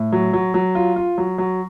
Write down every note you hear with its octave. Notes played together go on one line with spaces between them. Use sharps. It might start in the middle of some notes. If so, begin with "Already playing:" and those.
Already playing: A2
F#3
F#3
F#3
F4
F4
F#3
F#3